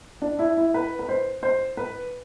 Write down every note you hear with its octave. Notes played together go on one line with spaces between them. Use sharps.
D4
E4
E4
B4
B4
C5
C5
B4